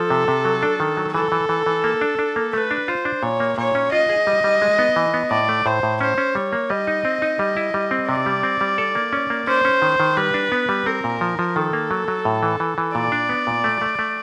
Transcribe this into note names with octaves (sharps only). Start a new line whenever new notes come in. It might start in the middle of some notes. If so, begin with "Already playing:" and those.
Already playing: F3 A4
C3
C3
F#3
D4
D#3
F#3
E3 A4
E3
E3
E3
A#3
D4
D4
A#3
A3 B4
D4
F4 C5
D4
A#2 C#5
A#3
A#2 C#5
C#4
F4 D#5
G#4
G3
G3
G#3
B3
E3
B3
A2 D5
A3
A2 C5
A2
C#4 C5
C#4
G3 C#5
A#3
G3 D#5
D#4
C4
D#4
G3
E4
G3
C4
C3 D5
G3
C4
G3
A4
A#3
C#4
A#3
C#4 C5
C#4
D#3
D#3
G3 B4
D4
B3
G3
C4 A#4
A#2
F3
F3
D#3 A4
A#3
F#3
F#3
A2
E3
E3
E3
A#2 D5
D4
B3
A#2
A3
A3
A3